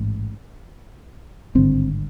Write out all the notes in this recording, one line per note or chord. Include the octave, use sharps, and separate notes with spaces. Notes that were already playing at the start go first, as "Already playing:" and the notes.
Already playing: A1 G#2
G#1 G2 D3 C4